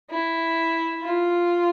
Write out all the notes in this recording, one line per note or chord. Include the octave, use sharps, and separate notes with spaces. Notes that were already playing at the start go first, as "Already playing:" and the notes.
E4
F4